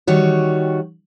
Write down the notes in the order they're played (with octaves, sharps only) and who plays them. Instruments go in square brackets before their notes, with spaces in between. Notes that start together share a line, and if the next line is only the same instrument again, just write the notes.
[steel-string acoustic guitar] D#3 G3 F#4 C#5